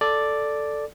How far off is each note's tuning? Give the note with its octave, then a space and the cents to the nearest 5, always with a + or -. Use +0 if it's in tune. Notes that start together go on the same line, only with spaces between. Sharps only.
A4 +0 D5 +0